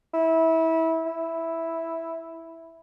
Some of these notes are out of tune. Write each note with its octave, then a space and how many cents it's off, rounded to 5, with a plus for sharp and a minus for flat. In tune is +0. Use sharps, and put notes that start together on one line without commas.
E4 -25
E4 -5